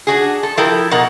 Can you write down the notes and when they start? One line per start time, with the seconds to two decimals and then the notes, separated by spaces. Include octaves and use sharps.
0.07 D4 F#4 G#4
0.43 A4
0.57 F3 E4 G4 A4 A#4
0.91 B2 A#4 F#5